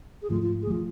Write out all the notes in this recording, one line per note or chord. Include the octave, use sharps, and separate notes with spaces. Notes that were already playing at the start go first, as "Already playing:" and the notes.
G#4
G#2 F3 A3 F4
F4
G#4
F3 A3 F4